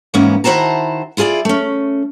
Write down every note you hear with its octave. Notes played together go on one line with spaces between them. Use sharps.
E2 G#2 A#3 B3 C#4
D#3 E4 F#4 C5 A5 A#5
E4 F4 G#4 A4 D5
A3 C#4